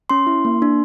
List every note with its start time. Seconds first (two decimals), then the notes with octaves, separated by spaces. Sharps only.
0.10 C#4 C6
0.27 E4
0.45 A#3
0.62 D4